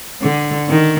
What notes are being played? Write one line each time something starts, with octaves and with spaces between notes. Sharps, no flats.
D3
D#3